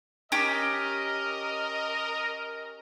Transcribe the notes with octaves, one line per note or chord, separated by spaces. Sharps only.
C#4 G4 A#4 D#5